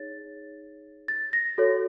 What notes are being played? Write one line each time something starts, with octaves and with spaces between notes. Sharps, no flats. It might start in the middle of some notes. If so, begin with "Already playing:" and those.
Already playing: D#4 G#4 C#5 A6
A6
A#6
F#4 A4 C#5